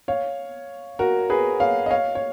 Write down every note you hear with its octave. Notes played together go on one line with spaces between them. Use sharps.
C#5 F5
F#4 A#4
G#4 B4
C#5 F5
D#5
C#5 F5
C#5